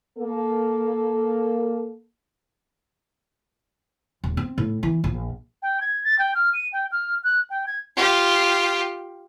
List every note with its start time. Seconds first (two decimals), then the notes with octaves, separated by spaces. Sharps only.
0.18 A#3 A4
4.24 D#1
4.37 C4
4.58 A2
4.83 E3
5.04 A#1
5.62 G5
5.81 G#6
6.04 A6
6.19 G5
6.35 F6
6.54 D#7
6.73 G5
6.92 F6
7.24 F#6
7.50 G5
7.67 G#6
7.96 F4 G4